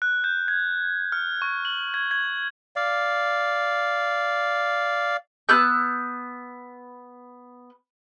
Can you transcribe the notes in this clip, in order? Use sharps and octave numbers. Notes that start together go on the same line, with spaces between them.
F#6
G6
G#6
F6
C#6
F#7
G#6
G#6
D5 F5
B3 E6 F#6 G6